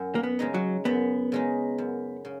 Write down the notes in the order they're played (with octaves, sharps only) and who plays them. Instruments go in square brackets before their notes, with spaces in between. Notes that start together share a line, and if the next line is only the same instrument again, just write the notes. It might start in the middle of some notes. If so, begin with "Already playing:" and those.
Already playing: [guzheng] F#2
[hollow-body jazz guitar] A#3
B3
[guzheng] C#3 G#3 D#4
[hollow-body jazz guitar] F#3
[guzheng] F#2 [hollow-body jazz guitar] B3
[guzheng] C#3 G#3 D#4
F#2
C#3